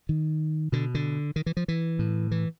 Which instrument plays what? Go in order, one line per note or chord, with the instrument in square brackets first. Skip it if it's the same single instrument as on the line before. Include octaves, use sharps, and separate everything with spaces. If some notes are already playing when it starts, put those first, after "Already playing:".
[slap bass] D#3
B2 D3
D3
D#3
E3
F3
E3
A2
E3